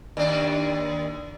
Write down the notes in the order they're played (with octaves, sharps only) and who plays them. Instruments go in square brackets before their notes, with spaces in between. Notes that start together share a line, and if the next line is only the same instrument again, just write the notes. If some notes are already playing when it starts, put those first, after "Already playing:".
[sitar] D#2 D4